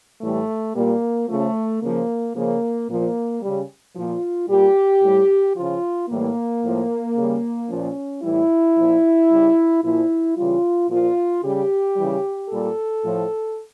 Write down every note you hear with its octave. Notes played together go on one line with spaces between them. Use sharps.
A2 E3 G3 A3
A#2 G3 A#3
C#3 F3 A3
C#3 F3 A#3
C#3 F3 A#3
A#2 F3 A#3
C#3 G3
A#2 F3 F4
A#2 G3 G4
A2 G3
C#3 F3 F4
A2 E3 G3 A#3
A2 F3
C#3 G3
A#2 F3 C#4
A2 E3 G3 E4
A#2 F3
C#3 G3
A#2 F3 E4
C#3 E3 G3 F4
A#2 F3 F4
C#3 G3 G4
C#3 E3 G3
A#2 G3 A4
A2 F3